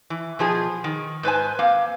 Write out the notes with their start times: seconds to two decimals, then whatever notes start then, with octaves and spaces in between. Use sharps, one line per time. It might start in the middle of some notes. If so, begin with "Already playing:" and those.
0.10 E3
0.39 B2 F3 G#4
0.84 D#3
1.23 G#2 B4 C5 G#5
1.59 A#3 C4 F5